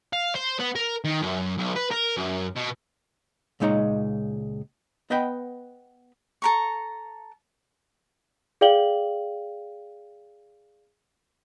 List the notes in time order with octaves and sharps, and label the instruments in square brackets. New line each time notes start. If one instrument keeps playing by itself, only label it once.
[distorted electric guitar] F5
C5
B3
A#4
D#3
F#2
B1
B4
A#4
F#2
B2
[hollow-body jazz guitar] C#2 A#2 G#3 D#4 C#5 A#5
B3 B4 D#5 F#5 G5 B5
[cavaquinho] A4 A#5 C#6
[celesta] G#4 D5 F5 G5 F#7 G7